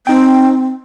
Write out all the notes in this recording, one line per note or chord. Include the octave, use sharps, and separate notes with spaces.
C4 D#4 G5